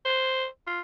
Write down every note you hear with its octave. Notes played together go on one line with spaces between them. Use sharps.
C5
F4